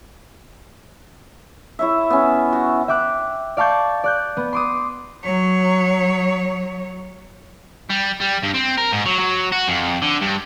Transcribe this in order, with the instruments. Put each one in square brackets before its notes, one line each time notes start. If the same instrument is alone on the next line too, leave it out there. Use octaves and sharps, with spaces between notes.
[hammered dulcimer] E4 C#5 E5
B3 C#4
F#4
[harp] E5 G5 D6 F#6
D5 F5 A5 C#6 G6
D5 F#6 G6
B3
C6 D6 D#6
[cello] F#3 C#5
[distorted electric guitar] G3
G3
G2
C4
A#4
G#2
F#3
F#3
F#4
F2
D3
G2